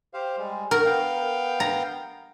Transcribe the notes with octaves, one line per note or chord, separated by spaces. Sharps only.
G4 C5 F5
G3 G#3
A#4 F#5 C#6
B3 F5 G5
A#5